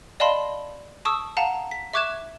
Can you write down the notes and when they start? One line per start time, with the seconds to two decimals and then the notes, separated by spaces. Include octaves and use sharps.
0.20 D5 D#5 F5 A5 B5 C6
1.05 A5 C#6 D#6 E6
1.37 F5 F#5 A5 A#5
1.71 B6
1.93 E5 C#6 D6 F#6 G#6 E7